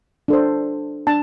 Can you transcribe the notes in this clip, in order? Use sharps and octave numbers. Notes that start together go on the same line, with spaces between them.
D4 A4 C5
D4 A5